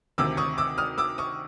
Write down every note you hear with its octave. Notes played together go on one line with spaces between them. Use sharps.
D2 C3 D#3 D6 E6
C#6 D#6
D6 E6
D#6 F6
D6 E6
C#6 D#6